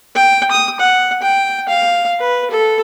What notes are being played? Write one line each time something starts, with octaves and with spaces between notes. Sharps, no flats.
G5
D#6
F#5
G5
F5
B4
A4